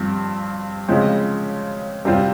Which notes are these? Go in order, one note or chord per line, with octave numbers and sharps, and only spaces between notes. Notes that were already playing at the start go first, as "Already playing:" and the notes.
Already playing: G2 F3 C4 F4
C#3 F3 G#3 C4
C3 G3 C4 F4